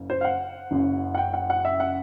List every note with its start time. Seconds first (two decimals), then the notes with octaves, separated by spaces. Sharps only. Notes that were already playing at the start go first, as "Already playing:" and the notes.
Already playing: F#1 C#3
0.10 C5
0.21 F5
0.24 F#5
0.71 F#1 F#2 C#3
1.15 F#5
1.18 G5
1.34 F#5
1.50 F#5
1.65 E5
1.80 F#5